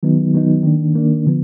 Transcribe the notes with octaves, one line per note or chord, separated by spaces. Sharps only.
D#3 F#3 B3 D#4
D#3 F#3 B3 D#4
D#3 A#3 D4
D#3 A#3 D4
D3 F3 B3